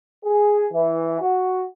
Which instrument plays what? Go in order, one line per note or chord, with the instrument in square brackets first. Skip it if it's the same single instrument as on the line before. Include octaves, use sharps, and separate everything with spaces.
[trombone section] G#4
E3
F#4